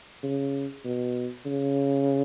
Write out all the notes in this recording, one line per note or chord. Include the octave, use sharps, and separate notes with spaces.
C#3
B2
C#3